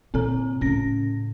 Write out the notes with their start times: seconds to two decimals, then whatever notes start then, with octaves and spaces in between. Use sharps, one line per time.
0.14 A#2 D3 C4 A4 A#5
0.61 A2 C#3 C#4 A#6